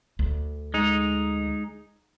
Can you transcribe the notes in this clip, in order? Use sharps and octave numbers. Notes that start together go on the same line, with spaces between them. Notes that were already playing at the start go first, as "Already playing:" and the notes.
D2
G#3 D#4